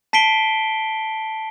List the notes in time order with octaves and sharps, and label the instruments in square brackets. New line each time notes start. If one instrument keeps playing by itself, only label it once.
[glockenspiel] A5 B6 C7 D7 G7